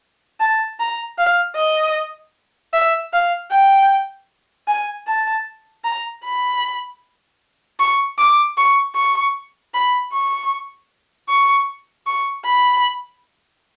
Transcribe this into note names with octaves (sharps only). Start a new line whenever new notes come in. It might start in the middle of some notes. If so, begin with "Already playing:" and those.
A5
A#5
F5
D#5
E5
F5
G5
G#5
A5
A#5
B5
C#6
D6
C#6
C#6
B5
C#6
C#6
C#6
B5